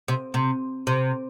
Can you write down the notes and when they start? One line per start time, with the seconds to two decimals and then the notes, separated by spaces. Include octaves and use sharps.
0.08 C3
0.34 C3
0.87 C3